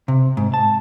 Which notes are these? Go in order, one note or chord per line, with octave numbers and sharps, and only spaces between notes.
C3
G#2
A5